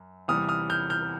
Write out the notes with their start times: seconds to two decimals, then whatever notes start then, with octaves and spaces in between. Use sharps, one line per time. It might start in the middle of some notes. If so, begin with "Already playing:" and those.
Already playing: F#2
0.28 E2 C3 E3 G3 D#6 F6
0.49 D#6 F6
0.70 F6 G6
0.90 F6 G6